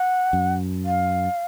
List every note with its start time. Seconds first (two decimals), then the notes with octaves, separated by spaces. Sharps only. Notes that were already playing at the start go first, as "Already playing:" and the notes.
Already playing: F#5
0.33 F#2
0.86 F5